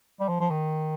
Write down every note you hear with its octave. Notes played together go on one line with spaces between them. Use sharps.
G3
F3
F3
D#3